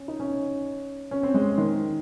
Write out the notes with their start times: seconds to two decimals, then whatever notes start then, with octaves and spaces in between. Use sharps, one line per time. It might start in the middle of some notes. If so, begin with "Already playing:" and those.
Already playing: C#4
0.08 D#4
0.20 C#4
1.11 C#4
1.23 C4
1.34 G#3
1.58 D#3